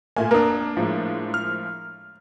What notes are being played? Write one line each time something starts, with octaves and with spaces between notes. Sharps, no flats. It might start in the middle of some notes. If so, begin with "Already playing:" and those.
A#2 A3 A#3 G#5
F1 A#3 D4 A#4 D#6
A2 F3 G#3
F6